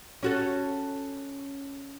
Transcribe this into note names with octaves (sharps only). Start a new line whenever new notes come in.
C#4 F#4 A4